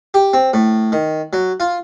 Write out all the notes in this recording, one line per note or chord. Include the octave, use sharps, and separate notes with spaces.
G4
C4
A2
D#3
F#3
F4